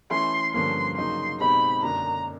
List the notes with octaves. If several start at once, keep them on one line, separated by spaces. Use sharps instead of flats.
E3 A3 C#4 E4 A4 C6
G2 D3 F3 A#3 C#4 C6
C#3 F#3 A#3 D#4 C6
B2 G#3 C4 D#4 G4 B5
F#2 D3 F#3 A#3 D4 A#5